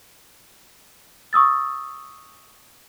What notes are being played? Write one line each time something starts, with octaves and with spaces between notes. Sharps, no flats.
C#6 D#6 E6 A6